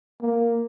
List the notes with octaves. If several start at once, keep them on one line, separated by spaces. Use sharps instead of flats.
A#3